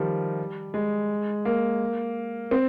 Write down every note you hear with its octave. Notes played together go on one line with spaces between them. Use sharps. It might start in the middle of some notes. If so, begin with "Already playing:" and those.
Already playing: D#3 F3 G3
G#3
A#3
C4